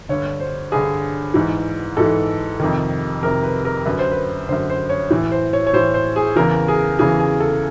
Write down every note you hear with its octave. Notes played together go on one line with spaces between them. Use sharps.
G2 D3 C#5
C5
G2 D3 G#4
G#2 E3
G#2 E3 A4
F2 C3 D#3
F2 C3 D#3 A#4
B4
A#4
F#2 D3 B4
C5
B4
F#2 D3 C5
C5
C#5
A2 E3
C5
C#5
C#5
A2 E3 C5
C5
G#4
E2 C#3 E3 A#4
G#4
E2 C#3 E3 G#4
G#4
A4